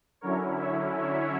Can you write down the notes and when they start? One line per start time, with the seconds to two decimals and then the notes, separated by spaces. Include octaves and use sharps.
0.21 D3 F#3 C#4 E4 A#4 C#5
0.59 C#5 E5
0.96 C#5 E5